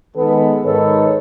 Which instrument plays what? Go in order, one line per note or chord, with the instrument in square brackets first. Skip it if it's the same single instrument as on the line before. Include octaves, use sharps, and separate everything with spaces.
[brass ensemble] D#3 G#3 B3 A4 B4
G#2 D#3 A4 B4 C#5